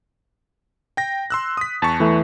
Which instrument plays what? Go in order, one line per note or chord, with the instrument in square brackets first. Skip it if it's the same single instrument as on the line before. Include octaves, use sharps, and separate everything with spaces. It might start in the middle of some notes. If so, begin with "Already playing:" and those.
[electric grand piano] G5 A#6
C6 E6 F#6
D#6 B6
[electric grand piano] E2 C#6 [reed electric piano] A5
[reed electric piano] E3 A3